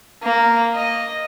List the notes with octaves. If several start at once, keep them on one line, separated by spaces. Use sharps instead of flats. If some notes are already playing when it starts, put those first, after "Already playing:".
A#3
D#5